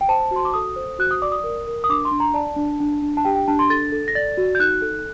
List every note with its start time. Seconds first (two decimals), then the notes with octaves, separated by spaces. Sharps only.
0.01 G5
0.09 C5 A5
0.31 F#4 C6
0.45 D6
0.54 A4 D#6
0.76 C5
0.99 F#4 F#6
1.11 D#6
1.22 D5 D6
1.32 D#6
1.44 A#4
1.67 A#4
1.84 D#6
1.89 D4 D6
2.05 C6
2.11 D4
2.20 A#5
2.34 D5 A5
2.56 D4
2.80 D4
3.02 D4
3.17 A5
3.25 G4 G5
3.36 G5
3.48 D4 A5
3.59 C6
3.70 A4 A6
3.92 A4
4.08 A#6
4.15 D5 A6
4.37 F#4
4.55 G6
4.60 D#4 F#6
4.82 A4